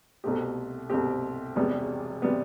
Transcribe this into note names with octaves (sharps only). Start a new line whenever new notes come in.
C2 B2 A3 C4 G4
C2 B2 A3 C4 G4
E1 E2 C3 G3 B3
C3 G3 B3